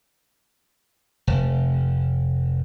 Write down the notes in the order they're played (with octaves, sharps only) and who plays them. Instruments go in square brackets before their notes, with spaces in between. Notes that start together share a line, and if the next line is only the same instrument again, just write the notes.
[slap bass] F1